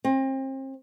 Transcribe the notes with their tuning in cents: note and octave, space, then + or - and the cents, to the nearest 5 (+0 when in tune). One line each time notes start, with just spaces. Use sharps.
C4 +35